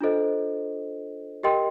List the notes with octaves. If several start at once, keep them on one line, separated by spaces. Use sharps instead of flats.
D4 F4 A4 C5 D#5
G4 A#4 D#5 G5 C6